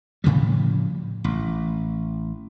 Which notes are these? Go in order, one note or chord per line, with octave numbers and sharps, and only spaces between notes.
A2 C#3 F3 G3
A1